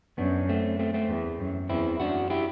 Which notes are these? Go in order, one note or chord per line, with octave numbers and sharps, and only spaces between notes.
F#2 B3 D4
A3 C4
A3 C4
A3 C4
E2
F#2
E2 C4 E4
F#2 D4 F#4
E4 G4